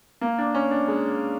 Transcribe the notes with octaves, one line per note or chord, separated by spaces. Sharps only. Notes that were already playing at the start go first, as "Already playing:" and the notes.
A#3
D4
C#4
D4
G#3